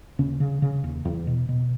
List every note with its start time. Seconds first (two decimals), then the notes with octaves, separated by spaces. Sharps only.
0.19 D#2 C#3 C#4
0.40 C#3
0.62 C#3
0.84 D#2
1.05 E2
1.27 B2
1.49 B2